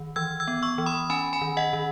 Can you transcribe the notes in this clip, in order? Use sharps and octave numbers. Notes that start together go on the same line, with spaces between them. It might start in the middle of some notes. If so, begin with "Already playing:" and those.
Already playing: D#3
E3 E6 G#6
E6 G#6
B3
C#6 E6
E3
B5 D#6
C#4 G#5 B5
G#5 B5
D#3
D#5 F#5
D#3